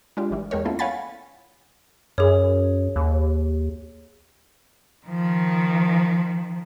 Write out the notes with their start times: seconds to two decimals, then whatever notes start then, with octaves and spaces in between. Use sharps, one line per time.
0.17 G#3 D4 F4 G4
0.31 G#1 E3 G3
0.51 E2 G#3 G4 A#4 C#5
0.65 A#3 B3 C#4 E4 F4 A4
0.79 C#5 F5 F#5 G#5 B5 A6
2.18 F#2 G#4 C#5
2.96 D#2
5.07 D#3 F3